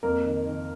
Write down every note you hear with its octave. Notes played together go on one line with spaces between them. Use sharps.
F2 A#3 A#4
D#3
D#3